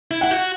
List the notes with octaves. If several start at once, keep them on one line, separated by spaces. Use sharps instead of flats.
E4
E4 F#5
F#4